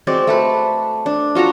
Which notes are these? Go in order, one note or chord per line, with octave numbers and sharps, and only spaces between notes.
G#3 C4 F#4 D5
A3 A4 B4
D4
F4 F#4 A4 A#5